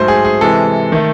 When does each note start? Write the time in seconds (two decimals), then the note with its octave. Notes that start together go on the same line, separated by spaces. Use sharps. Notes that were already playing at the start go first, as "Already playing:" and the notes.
Already playing: G#2 F#3 A3 C5
0.08 G#4
0.25 G#4
0.41 C3 E3 G#3 A4
0.92 D#3 A3